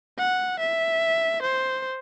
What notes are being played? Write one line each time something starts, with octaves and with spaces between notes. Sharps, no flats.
F#5
E5
C5